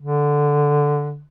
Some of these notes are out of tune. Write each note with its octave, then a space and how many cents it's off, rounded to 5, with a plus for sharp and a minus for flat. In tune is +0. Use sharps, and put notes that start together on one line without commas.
D3 -5